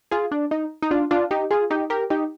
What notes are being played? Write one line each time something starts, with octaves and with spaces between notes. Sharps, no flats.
F4 G#4
D4
D#4
D#4
D4 F4
D4 F4
D#4 G4
F4 G#4
D#4 G4
G4 A#4
D#4 G4